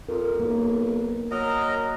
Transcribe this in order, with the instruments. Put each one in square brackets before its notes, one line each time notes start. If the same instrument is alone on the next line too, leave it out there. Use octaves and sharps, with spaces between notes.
[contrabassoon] F2 [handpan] A#4
[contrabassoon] B1 [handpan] A#3
[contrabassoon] F#3 [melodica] A#4 D#5 A#5